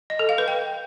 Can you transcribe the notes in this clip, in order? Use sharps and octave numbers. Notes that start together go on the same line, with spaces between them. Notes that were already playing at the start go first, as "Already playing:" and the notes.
D#5
A4
F5
B4
G5